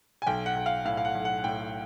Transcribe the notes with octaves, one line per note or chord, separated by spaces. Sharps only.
G#5
B1 G5
F#5
B1
F5
A2 F5
F5
F#5
B1
F#5
F#5
A2 G5